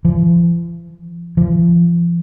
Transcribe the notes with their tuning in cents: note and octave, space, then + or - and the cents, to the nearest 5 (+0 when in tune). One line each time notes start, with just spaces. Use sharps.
F3 -45
F3 -40